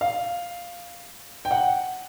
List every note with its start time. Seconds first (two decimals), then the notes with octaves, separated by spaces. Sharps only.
0.01 F5
1.45 G5
1.51 F#5